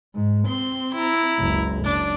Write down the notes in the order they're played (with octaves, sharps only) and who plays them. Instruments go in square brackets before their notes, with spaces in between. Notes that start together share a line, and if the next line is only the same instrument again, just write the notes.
[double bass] G#2
[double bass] C4 [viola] C6
[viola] E4 A#5
[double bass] F#1 C#2
[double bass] F#1 [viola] D4